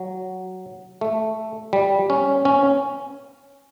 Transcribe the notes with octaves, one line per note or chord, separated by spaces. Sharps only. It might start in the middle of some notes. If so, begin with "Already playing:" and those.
Already playing: F#3
A3
G3
C#4
C#4